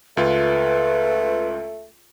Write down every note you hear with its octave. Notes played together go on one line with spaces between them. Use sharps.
C#2 A3 F4 B4